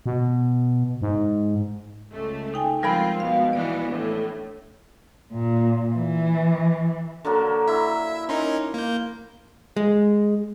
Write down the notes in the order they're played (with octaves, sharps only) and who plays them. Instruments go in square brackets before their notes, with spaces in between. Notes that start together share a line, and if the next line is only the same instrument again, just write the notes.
[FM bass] B2
G#2
[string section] C#2 A3
[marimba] D#4 G5 G#5
[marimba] F3 G3 G#3 [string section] C4 F4 [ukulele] A#4 G5 B5
[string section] B2 G#3 [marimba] F5
[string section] B2 E3 B3 [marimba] D5
[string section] A2 [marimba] D4
[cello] A#2
E3
[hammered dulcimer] D3 F#3 A#3
[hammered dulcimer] E4 [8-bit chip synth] E5
[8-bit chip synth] C#4 D#4 A#4 [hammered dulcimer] C6
[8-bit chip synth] A#3 G6
[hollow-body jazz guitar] G#3